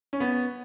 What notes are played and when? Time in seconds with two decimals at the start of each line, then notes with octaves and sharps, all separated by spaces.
0.13 C#4
0.20 B3